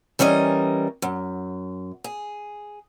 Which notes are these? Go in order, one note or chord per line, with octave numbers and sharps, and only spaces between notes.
E3 G3 C#4 A#4 D#5
F#2
G#4